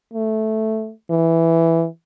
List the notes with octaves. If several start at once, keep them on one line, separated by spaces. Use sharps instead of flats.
A3
E3